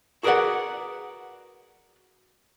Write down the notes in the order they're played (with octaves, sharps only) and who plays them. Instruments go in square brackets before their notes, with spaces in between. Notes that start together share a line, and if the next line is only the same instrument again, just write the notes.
[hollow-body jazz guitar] F#4 G#4 A#4 B4 D5 F#5